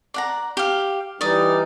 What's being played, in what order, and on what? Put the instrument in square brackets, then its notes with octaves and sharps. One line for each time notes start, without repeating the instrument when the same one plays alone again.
[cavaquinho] D5 F#5 A#5
G4 F5
[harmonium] E3 G3 D#4 [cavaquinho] D5 D#6